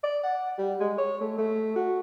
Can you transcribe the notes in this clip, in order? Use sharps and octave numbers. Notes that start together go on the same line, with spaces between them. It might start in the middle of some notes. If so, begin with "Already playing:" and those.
D5
F#5
G3
G#3
C#5
A3
A3
F#4